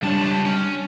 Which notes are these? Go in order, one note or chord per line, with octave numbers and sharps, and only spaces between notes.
C#2 G3 D4 C#5 A5
C#4